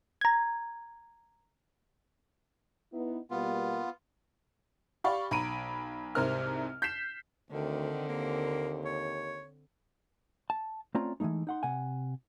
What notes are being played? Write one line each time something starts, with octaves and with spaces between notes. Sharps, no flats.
A#5 G#6
B3 D#4 E4
B2 G3 A#3 B3 F4
G4 D5 F5 B5 C#6
B1 A#5 B5 D7 D#7
C2 G#2 C3 C4 A#4 F6
G6 B6 C7 E7
D2 D3 D#3 C4
D#2 A#3
C#5
A5
A3 C4 C#4 F4 D5 A#5
E3 F3 G#3 A3 D#4
D#4 F#5 C6
C3 F#5 G#5